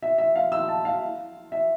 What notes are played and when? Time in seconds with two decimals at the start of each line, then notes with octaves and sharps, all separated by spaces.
0.03 E5
0.18 E5
0.36 F5
0.52 E6
0.69 A5
0.85 F5
1.52 E5